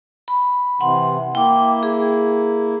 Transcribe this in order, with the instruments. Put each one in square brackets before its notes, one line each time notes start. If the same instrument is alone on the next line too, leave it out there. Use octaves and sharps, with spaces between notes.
[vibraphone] B5
[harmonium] C3 E3 [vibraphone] F#5 C6
[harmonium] A#3 E4 [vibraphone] G5 D6
[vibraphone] G#4